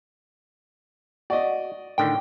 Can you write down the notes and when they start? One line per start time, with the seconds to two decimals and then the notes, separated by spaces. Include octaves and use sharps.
1.30 F#4 D5 D#5
1.98 A2 D3 D#3 G5